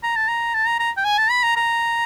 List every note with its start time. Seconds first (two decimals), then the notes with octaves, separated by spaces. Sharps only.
0.04 A#5
0.16 A5
0.28 A#5
0.54 A5
0.67 A#5
0.80 A#5
0.97 G5
1.05 G#5
1.18 A5
1.30 B5
1.43 A#5
1.56 A#5